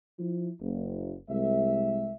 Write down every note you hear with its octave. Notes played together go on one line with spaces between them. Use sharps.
F3 E4
F#1
C2 G#3 E5